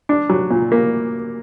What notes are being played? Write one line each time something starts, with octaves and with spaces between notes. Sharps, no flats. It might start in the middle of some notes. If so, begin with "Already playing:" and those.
D4
F#3
A#2
A#3